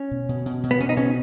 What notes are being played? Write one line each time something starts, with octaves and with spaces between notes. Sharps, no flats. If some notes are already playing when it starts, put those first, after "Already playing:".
Already playing: C#4
B2
B2
B2
B2
B3
B2 C#4
D#4
B2 C#4